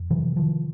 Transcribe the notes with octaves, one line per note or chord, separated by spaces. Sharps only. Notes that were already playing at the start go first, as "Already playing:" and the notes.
Already playing: F2
C3 E3 F#3
D#3 F3